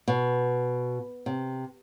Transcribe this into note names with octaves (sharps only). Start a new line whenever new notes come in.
B2
C3